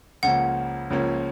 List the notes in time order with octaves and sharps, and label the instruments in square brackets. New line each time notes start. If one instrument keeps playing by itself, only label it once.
[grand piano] C#2 C#3 F3 A#3 C#4 [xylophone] F#5
[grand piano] C#2 C#3 F3 A#3 C#4